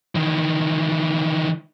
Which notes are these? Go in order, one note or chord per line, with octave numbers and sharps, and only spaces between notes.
D#3 E3